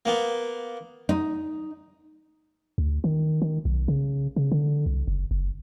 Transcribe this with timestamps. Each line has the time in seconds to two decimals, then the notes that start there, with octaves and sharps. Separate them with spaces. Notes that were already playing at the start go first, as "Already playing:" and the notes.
0.05 A#3 B3
1.09 D#4
2.78 D2
3.04 D#3
3.42 D#3
3.65 B1
3.88 C#3
4.36 C#3
4.52 D3
4.86 C2
5.08 F#1
5.31 F#1